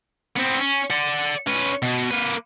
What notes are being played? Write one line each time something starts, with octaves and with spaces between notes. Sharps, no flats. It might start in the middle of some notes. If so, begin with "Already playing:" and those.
B3 C4
C#4
D5 F#5
C#4 B4
B2
A#3 B4